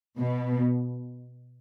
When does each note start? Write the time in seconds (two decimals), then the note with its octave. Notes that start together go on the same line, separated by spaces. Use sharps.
0.19 B2